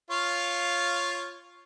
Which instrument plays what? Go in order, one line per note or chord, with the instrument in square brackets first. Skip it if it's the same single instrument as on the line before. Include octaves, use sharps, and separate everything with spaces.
[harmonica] F4 C#5 F5